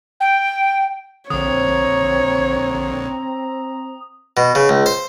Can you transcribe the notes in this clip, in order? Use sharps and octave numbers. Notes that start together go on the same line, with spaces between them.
G5
A#1 D3 C4 C#5 A#5 D#6
B2
C#3
C#2
C5